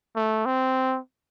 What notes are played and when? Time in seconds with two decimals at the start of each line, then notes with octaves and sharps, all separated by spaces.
0.16 A3
0.46 C4